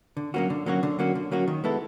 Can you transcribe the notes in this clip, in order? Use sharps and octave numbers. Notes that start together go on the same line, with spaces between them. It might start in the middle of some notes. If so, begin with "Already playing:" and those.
D3
F#3 A#3 C#4 F#4
D3
F#3 A#3 C#4 F#4
D3
F#3 A#3 C#4 F#4
D3
F#3 A#3 C#4 F#4
D#3
G#3 B3 E4 A4